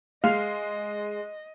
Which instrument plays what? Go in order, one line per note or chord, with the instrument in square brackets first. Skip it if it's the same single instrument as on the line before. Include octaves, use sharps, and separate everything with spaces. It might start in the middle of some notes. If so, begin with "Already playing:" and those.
[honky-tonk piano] G#3 [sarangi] D#5 [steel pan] F5